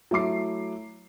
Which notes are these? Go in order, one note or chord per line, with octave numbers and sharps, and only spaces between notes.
F#3 A3 E4 D6 C7